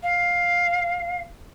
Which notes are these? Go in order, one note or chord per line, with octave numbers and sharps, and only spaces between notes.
F5